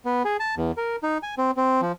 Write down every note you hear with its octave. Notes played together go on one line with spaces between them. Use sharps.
B3
G#4
A5
E2
A#4
D#4
G#5
C4
C4
F3